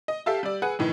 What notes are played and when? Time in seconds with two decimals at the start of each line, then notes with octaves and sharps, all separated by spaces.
0.08 D#5
0.26 G4 A4 E5 F5 A5 E6
0.43 G3 D5
0.62 G#4 B4 F#5
0.79 F2 A2 D#3 E3